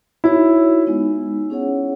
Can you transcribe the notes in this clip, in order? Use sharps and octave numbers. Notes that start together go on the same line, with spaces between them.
D#4 E4 F#4 C#5
G#3 B3 D#4
C#4 E4 G#4 C#5 F#5